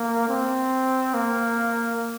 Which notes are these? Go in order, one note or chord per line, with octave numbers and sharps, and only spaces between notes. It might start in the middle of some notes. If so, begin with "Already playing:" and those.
Already playing: A#3
C4
A#3